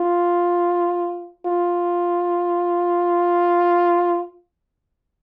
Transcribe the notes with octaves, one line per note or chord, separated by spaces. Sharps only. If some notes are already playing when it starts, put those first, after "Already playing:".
Already playing: F4
F4